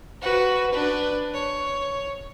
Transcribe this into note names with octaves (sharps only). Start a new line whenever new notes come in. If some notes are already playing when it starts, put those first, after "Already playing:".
F#4 B4
D4 B4
C#5